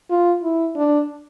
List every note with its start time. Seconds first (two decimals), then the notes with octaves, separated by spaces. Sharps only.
0.10 F4
0.43 E4
0.76 D4